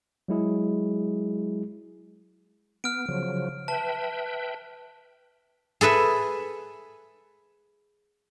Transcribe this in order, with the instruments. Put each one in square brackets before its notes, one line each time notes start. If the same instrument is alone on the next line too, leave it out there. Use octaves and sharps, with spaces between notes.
[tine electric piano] F#3 G#3 E4 G#4
[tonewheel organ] B3 [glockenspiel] F6 D7
[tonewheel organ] C#3 F3 F#3
[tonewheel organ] B4 E5 G5 [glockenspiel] A5
[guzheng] G#4 A4 B4 E5